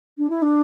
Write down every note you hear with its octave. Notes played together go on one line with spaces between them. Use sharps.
D4
E4
D4